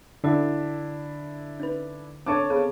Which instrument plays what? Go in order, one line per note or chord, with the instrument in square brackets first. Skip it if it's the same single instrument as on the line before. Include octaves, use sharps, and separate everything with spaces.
[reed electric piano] D3 [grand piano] D4 E4 A4 [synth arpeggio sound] F#4 D5
[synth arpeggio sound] C#4 D#4 B4
[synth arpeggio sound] C4 D4 A4 [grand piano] C#5 A5 D6
[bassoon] C#3 [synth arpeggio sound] B3 C4 A4